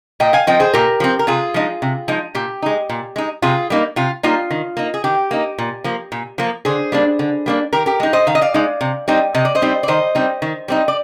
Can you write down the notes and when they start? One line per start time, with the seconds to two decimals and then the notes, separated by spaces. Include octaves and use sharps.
0.20 A#2 D#5 G5
0.33 F5 G#5
0.47 F3 C4 D#5 G5
0.60 G#4 C5
0.73 A#2 G4 A#4
1.00 F3 C4
1.19 A#4
1.27 C3 F4 G#4
1.54 F3 G#3 D#4
1.82 C3
2.08 F3 G#3 D#4
2.35 A#2 G4
2.62 G#3 D#4
2.89 A#2
3.16 G#3 D#4
3.42 C3 F4 G#4
3.70 G3 A#3 D#4
3.96 C3 F4
4.23 G3 A#3 D#4 F4
4.51 D#3
4.77 A#3 D#4
4.94 G#4
5.04 D#3 G4
5.31 A#3 D#4
5.58 A#2
5.84 F3 A#3
6.12 A#2
6.38 F3 A#3
6.65 D3 G#4 C5
6.92 G3 A#3 D4
7.19 D3
7.46 G3 A#3 D4
7.73 D#3 G4 A#4
7.86 G4 A#4
8.00 G#3 D#4
8.13 C5 D#5
8.27 D#3 F5
8.35 D#5
8.41 D5 F5
8.54 G#3 D#4
8.81 C3
9.08 G3 C4 D#4
9.35 C3 D#5
9.45 D5
9.55 C5 D#5
9.62 G3 C4 D#4
9.83 D5
9.88 D#3 C5 D#5
10.15 G3 C4 D#4
10.42 D#3
10.68 G3 C4 D#4
10.88 D5